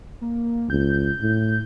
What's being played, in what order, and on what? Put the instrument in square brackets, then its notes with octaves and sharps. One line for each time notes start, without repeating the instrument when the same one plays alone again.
[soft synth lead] A#3
[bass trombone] C#2 [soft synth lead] G6
[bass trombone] A2